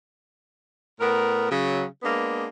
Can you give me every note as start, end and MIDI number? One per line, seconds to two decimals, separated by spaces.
1.00 1.50 45
1.00 1.50 59
1.00 1.50 70
1.50 1.84 49
1.50 1.84 54
2.03 2.48 56
2.03 2.48 58
2.03 2.48 59
2.03 2.48 62